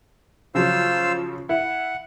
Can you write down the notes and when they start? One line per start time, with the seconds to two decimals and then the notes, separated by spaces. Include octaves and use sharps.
0.55 C#3 F3 F#3 F4 C5 E6
1.49 E4 F#5